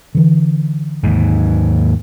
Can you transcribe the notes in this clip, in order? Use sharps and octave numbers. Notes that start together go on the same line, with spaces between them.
D3 E3
D#2 G#2